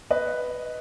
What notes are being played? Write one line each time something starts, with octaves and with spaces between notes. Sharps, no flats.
B4 D#5